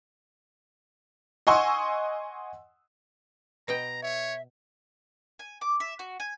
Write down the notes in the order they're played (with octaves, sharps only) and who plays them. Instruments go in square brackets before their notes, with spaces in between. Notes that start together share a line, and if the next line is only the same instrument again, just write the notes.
[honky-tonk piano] D#5 F#5 G#5 C6 C#6 E6
[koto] B2 D#5 G5 [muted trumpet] A#5
[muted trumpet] C#5 [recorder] E5
[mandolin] G#5
D6
E5
F#4
G#5